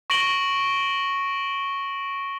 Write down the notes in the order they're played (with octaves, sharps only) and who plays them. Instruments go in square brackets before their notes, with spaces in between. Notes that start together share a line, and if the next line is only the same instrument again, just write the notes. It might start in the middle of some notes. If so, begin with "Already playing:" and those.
[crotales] C#6 A#6 D7 F#7 G7